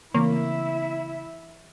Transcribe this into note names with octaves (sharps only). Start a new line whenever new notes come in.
C#3 E3 A3 A#3 C4 E4 E5